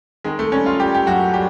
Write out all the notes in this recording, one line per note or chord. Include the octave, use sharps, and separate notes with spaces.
D#3 G#3
A3
G3 C#4
F4
G3 G4
G4
F#2 F#4
G3 G4